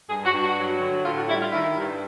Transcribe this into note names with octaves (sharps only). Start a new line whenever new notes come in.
G2 G#4
F#4
G2
F#4
F#3
D3
A2 F4
F#4
G3 E4
F4
D#3 E4
G2